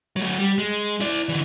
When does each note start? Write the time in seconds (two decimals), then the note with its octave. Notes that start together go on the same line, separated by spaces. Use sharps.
0.16 F#3 A3
0.38 G3
0.58 G#3
1.00 E4 D5
1.29 D3 E3